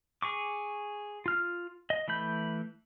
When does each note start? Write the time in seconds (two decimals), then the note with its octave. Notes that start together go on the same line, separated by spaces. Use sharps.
0.22 G#4 C#6 D6
1.26 F4 F6
1.90 D#5
2.08 E3 A3 B5 G6